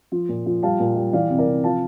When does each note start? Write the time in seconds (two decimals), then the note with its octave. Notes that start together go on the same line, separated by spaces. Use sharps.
0.12 F3
0.29 A#2
0.46 F3
0.63 G3 F5 A5
0.80 A#2
0.96 G3
1.13 E3 D5 F5
1.30 C3
1.39 A#4 D5
1.47 C3
1.64 F3 F5 A5